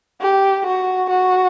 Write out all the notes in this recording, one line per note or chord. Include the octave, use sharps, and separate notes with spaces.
G4
F#4
F#4